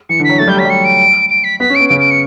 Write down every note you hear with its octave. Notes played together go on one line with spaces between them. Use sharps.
E3 C#7
D3
B6
F#3
A3 A6
G3 G6
F#3 B6
G3
C#7
D7
D7
B6
B3 B6
C#4
D7
B3
C#3 D7
D7
C#7